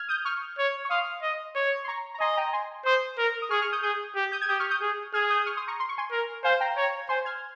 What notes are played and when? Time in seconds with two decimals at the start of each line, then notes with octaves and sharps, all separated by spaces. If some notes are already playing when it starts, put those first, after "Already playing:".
Already playing: F6 G#6
0.08 D#6 G6
0.25 C#6 F6
0.58 C#5
0.85 C#6
0.90 F5 C6 D#6
1.22 D#5
1.55 C#5
1.84 C6
1.88 A#5 C#6
2.14 A#5
2.20 D#5 G#5 C6
2.37 G5 A#5
2.53 G#5 C6
2.85 C5 C6 D#6
3.18 A#4
3.42 D#6
3.51 G#4 C#6 F6
3.62 C#6 F6
3.72 D#6 G6
3.83 G#4 D#6 G6
4.16 G4
4.32 D#6 G6
4.41 G#6
4.49 G4 D#6 G6
4.60 C#6 F6
4.70 D#6 G6
4.82 G#4
5.14 G#4 F6 G#6
5.30 D#6 G6
5.41 D#6
5.46 C#6 F6
5.57 C6 D#6
5.68 A#5 C#6
5.80 C6
5.89 C#6
5.98 G#5 C6
6.12 A#4
6.44 C5 F5 G#5
6.60 G5 A#5
6.76 C#5 G5 A#5
7.09 C5 G#5 C6
7.25 F6 G#6